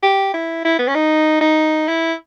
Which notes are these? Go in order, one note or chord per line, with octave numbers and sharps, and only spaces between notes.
G4
E4
E4
B3
C#4
D#4
D#4
E4